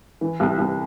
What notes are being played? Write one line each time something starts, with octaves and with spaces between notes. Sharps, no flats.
E3
C2
C2